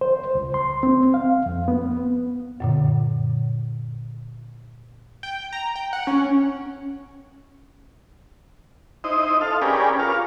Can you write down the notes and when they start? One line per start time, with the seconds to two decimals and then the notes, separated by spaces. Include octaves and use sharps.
0.01 C5
0.35 C#2
0.54 C6
0.83 C4
1.14 F5
1.46 F2
1.68 B3
2.60 F#2 A#2 D3
5.23 G5
5.53 A#5
5.76 G5
5.93 F#5
6.07 C#4
9.04 D#4 E4 C5 D#5
9.41 A4 F5
9.62 C#4 G4 G#4 A#4 B4 D5
9.99 F4 A#4 C#5 F5